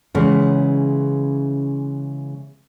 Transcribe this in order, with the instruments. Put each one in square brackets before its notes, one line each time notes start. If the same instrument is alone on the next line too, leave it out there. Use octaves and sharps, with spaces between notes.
[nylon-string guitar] C#3 E3 G#3 B3 C#4